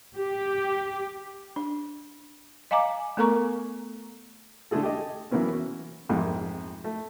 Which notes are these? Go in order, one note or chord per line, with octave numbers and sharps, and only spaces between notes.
G4
D4
D#5 F5 G#5 A#5 D6
A3 B3 A4 A#4 A#5 C#6
D3 G#3 A3 G#4 A4
G4 A4 D#5
E3 F#3 A#3 B3 C#4
F#4
A#1 F2 G#2 C3
A3